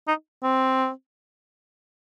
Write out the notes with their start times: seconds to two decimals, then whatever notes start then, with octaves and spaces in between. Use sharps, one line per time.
0.08 D#4
0.43 C4